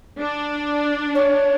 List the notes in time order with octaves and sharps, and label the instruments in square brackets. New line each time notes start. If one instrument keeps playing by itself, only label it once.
[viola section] D4
[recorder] C#5